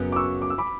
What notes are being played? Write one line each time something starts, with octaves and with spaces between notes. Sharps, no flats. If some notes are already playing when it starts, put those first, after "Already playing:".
Already playing: F#2 C#3 F#3 B3
D6
C#6 E6
D6
E6
B5 D6